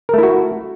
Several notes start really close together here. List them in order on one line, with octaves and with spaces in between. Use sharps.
A#4 A3 E4 F#4